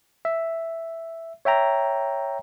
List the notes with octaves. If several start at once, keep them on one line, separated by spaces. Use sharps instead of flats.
E5
C#5 E5 G5 A#5